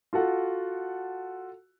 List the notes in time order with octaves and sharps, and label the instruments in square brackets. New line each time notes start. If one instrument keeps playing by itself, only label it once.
[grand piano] F4 F#4 A4 F#5